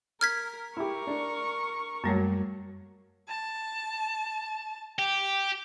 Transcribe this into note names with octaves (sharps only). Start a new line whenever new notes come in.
A#4 F6 G#6 B6
E4 G4 A#4 C#6
D4
F#2 F#3 G3 A3 A#3
A5
G4